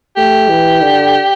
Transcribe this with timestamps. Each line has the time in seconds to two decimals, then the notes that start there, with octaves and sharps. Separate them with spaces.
0.17 A3 G4
0.49 E3
0.82 D3